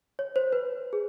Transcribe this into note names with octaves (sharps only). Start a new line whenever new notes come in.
C#5
C5
B4
G#4